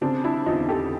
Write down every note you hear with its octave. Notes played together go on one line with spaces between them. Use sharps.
C#3 C4 D4
D4 E4
E2 D#4 F4
G4 A4